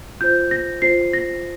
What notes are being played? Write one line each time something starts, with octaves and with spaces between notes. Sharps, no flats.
F4 C5 G6
A#6
F4 C5 C7
A#6